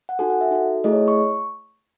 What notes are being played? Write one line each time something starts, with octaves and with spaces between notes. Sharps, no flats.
F#5
D#4 F#4 A4 G#5
F#5
E5
D#4 F#4 A4
A3 E4 G#4 D#5
C#5
C#6